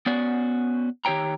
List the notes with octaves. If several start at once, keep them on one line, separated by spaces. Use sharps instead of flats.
B3 C#4 F#4 D5
D#3 G4 C#5 G5 A#5